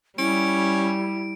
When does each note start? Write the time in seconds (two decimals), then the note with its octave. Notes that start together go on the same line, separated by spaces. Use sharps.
0.18 G3 C#4 E4 D7